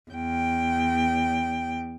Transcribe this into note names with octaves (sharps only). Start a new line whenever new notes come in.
E2 G5